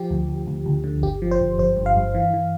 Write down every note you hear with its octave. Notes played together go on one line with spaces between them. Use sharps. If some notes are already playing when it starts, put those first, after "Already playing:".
Already playing: F3 G4
D2
D2
D2
D2
D3
G1 G4
F3
C5
G1
G1 C5
G2
F5
G2
E3
E3